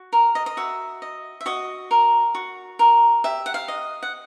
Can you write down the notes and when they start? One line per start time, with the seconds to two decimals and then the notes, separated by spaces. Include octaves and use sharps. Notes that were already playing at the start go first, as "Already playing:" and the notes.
Already playing: F#4
0.13 A#4
0.35 D#5
0.46 D#5
0.57 F#4 E5
1.02 D#5
1.41 E5
1.46 F#4 D#5
1.91 A#4
2.35 F#4
2.79 A#4
3.24 G4 E5
3.46 F#5
3.54 F5
3.68 D#5
4.03 F#5